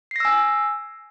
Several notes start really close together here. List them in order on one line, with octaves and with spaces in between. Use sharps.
C7 A#6 E6 G#5